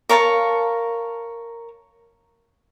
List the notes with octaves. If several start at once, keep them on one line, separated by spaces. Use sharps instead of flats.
A#4 C#5 F5 A5